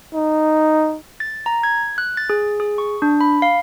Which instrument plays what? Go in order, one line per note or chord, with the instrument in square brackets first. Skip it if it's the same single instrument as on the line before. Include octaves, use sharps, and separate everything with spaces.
[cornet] D#4
[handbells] A6
A#5
G#6
F#6
A6
G#4
G#4
C#6
D4
B5
F5